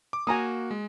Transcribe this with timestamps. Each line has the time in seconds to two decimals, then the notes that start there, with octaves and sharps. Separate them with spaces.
0.13 D6
0.27 A#3 F#4 G#5 A#5 D#6
0.71 G#3